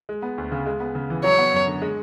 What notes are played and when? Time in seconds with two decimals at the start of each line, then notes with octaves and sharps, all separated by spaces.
0.09 G#3
0.22 B3
0.38 D2
0.52 C#3
0.66 G#3
0.80 B3
0.95 C#3
1.10 E3
1.24 F#3 C#5
1.38 B3
1.53 F#2
1.67 D3
1.82 G#3